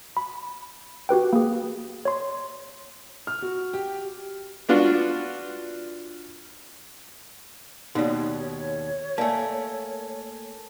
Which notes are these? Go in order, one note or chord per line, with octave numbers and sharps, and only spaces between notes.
B5
F#4 G4 B4 G5
A#3 G#4
C#5 C6
F6
F#4
G4
B3 D4 F4 F#4
D#2 B2 D#4 C#5 D5
A3 A#3 D5 G#5 A5